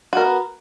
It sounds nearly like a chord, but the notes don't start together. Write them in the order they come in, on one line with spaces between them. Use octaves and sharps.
F#4 A#4 B3